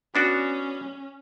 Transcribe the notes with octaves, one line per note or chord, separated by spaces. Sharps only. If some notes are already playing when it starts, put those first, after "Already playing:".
B3 C#4 D4 F#4